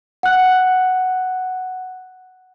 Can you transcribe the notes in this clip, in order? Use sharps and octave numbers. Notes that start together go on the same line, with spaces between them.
F#5 F#6